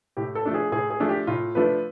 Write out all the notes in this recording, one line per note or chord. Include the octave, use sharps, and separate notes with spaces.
A2 G4
A4
F3 A3 D4
G#4
A2 G#4
G#4
F3 A3 D4
G4
A2 F4
F3 A3 D4 B4